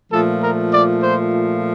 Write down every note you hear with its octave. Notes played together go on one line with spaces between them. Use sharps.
A#2 F3 A3 A4
A#4
D5
C5